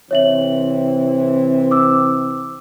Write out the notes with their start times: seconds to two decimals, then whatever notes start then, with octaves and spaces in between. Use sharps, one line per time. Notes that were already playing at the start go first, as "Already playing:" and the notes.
0.11 C3 E3 C4 C#5 E5 F#7
1.71 D6 E6